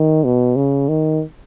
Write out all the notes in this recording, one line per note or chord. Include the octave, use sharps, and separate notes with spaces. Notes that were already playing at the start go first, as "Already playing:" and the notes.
Already playing: D#3
B2
C#3
D#3